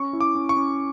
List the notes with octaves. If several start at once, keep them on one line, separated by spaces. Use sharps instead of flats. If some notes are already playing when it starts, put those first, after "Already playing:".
Already playing: C#4 C#6
E4
D6
C#4
C#6
C#4